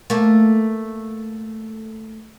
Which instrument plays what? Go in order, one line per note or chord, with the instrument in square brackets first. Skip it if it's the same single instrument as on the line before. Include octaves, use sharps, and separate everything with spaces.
[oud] A3 A#3